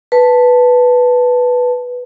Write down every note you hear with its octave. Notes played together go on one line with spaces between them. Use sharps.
B4 A5